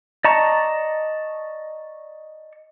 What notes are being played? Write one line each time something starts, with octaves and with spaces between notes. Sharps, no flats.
D5 D#5 A5 A#5 C#6